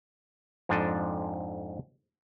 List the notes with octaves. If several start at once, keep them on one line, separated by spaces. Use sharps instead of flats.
F2 G#2 F3 D4 A4 D#5